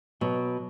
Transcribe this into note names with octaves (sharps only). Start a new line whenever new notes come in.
B2 F#3